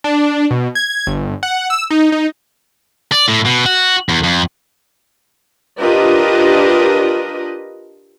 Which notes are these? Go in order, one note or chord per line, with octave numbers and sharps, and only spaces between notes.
D4
B2
G#6
G1
F#5
E6
D#4
D#4
D5
A2
B2
F#4
E2
F2
D4 F4 G4 A#4 B4 D#5